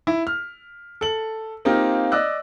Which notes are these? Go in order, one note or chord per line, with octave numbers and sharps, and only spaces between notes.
E4
F6
A4 F#7
A#3 C4 D#4 F4 G4
D5 D#5 E6 F#6